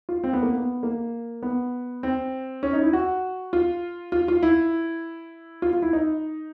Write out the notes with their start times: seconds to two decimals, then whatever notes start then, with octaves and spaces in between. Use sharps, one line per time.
0.09 F4
0.24 C4
0.33 B3
0.43 A#3
0.53 B3
0.83 A#3
1.43 B3
2.03 C4
2.63 C#4
2.73 D#4
2.83 E4
2.93 F#4
3.53 F4
4.12 F4
4.28 F4
4.43 E4
5.62 F4
5.73 F4
5.82 E4
5.93 D#4